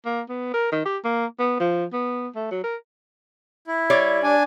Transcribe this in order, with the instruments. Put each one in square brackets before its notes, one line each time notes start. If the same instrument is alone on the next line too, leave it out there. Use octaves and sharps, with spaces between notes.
[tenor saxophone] A#3
B3
A#4
D#3
G4
A#3
B3
F3
B3
A3
F#3
A#4
[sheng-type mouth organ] E4
[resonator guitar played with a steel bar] G3 C#5 D5
[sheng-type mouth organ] D4 G#5